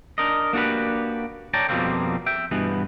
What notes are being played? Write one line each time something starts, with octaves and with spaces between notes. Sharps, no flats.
D4 A#4 D#5
A#3 D4 F#4 G4 B4
C#5 D5 G5 A5 A#5
F2 B2 F3 G3 A#3 C4
E5 G5
G2 B2 E3 B3